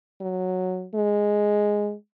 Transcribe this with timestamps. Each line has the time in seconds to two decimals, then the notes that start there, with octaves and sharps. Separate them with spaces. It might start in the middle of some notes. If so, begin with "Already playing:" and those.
0.21 F#3
0.95 G#3